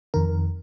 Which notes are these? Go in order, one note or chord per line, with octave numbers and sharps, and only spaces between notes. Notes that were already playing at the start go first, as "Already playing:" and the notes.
F2 D#3 A#4